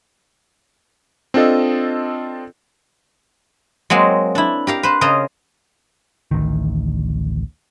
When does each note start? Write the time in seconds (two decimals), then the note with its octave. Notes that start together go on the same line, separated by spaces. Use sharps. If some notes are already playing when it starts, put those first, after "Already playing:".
1.34 C4 D4 F4 A4 D#5
3.90 F#3 G#3 A#3 C4
4.35 D4 E4
4.67 G4 A#4 F5
4.83 B4 C5
5.01 C#3 A#4 C5 D#5
6.31 A1 D2 D#3